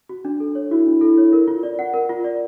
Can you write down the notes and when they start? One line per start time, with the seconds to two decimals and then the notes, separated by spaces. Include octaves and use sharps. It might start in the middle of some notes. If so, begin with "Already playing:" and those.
0.09 F#4
0.25 D4
0.40 A4
0.55 C#5
0.71 E4 F#4
0.86 D4
1.01 A4
1.18 C#5
1.33 A#4
1.48 F4
1.63 D5
1.79 F#5
1.94 A#4
2.09 F4
2.24 D5